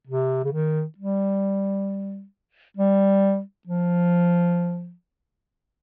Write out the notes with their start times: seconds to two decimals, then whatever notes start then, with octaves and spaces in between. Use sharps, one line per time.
0.07 C3
0.44 C#3
0.52 D#3
0.98 G3
2.77 G3
3.67 F3